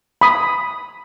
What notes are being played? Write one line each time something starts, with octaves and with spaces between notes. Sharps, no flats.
B5 D#6